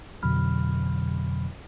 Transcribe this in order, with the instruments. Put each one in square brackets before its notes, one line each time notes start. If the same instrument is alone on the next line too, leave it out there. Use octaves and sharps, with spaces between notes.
[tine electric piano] F2 B2 D3 F#3 B5 F6